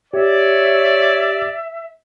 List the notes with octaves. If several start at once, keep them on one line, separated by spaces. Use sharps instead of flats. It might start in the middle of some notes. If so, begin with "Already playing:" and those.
G4 C#5 D5 E5